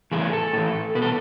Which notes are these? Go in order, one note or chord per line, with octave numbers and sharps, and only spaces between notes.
A2 E3 G#4
A4
A2 E3
B2 B4
A4